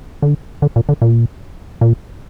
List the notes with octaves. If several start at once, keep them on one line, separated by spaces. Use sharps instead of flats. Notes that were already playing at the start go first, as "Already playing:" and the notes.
D3
D3
A#2
D3
A#2
A#2